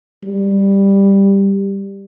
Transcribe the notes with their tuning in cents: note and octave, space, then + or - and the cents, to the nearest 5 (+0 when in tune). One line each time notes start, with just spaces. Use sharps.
G3 +10